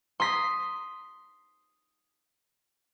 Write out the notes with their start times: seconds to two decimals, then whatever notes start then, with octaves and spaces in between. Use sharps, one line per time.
0.20 C6 D#6 B6